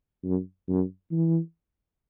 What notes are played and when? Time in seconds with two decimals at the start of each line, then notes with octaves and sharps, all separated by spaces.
0.24 F#2
0.69 F#2
1.11 E3